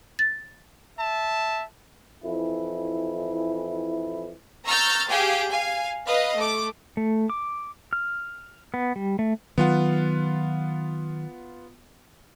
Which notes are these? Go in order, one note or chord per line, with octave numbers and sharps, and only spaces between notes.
A6
E5 A5
F2 E3 E4
A#5 C#6 E6 F6 G6 A6
G4 G#4 F5 G5 G#5
F5 G#5
B4 D#5 F5
A3 D6
A3
D6
F6
B3
G3
A3
D#3 F#3 B3 F4 F#5